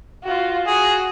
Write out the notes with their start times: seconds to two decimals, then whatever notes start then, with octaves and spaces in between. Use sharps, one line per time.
0.23 F4 F#4
0.67 F#4 G#4